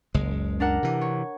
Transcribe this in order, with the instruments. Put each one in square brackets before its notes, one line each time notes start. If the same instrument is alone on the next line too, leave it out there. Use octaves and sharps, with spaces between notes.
[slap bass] F#1 C#2 G#3
[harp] D4 A#4 F#5
[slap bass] C3 E3
[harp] C#5